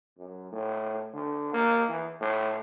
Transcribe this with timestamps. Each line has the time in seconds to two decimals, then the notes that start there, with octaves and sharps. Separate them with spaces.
0.18 F#2
0.52 A2
1.13 D3
1.53 A#3
1.89 E3
2.21 A2